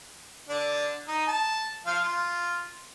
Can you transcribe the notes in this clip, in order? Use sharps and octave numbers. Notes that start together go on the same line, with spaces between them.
D3 D4 D5
D#4
A5
F3 F5
F4